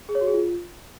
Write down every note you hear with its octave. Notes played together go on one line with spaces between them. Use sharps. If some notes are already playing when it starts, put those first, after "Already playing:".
G#4
C#5
F#4
G#4
F4